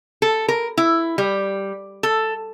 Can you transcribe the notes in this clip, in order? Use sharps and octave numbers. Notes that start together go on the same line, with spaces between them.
A4
A#4
E4
G3
A4